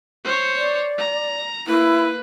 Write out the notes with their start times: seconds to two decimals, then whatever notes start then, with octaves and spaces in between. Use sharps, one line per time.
0.24 C5 C#5
0.57 D5
0.98 A#5
1.67 A#3 E4 B4